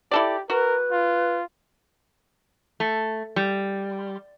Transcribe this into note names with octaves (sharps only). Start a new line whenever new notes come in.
E4 G4 A4 D5
F#4 A#4 B4
F4
A3
G3